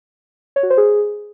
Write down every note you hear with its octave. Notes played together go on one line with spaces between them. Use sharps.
C#5
F#4
C5
G#4